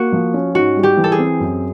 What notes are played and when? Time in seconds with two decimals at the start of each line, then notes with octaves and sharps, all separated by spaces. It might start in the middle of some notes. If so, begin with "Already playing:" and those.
Already playing: A#3 F#4
0.13 F3
0.34 C#4
0.55 G#2 F#4
0.77 G3
0.83 G4
0.97 E3
1.04 A4
1.12 G#4
1.18 C4
1.40 F#2